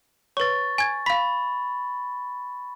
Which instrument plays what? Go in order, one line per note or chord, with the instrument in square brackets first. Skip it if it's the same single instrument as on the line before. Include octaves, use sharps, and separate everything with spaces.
[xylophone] B4 C#5 [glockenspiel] C#6 A6
[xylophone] G#5 G#6
[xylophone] F5 B6 [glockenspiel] B5